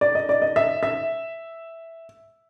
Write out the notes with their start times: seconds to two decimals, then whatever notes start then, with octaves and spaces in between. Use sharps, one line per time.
0.01 D5
0.15 D#5
0.29 D5
0.42 D#5
0.56 E5
0.83 E5